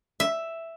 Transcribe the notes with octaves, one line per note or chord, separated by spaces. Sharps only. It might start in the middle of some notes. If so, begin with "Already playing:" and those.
E5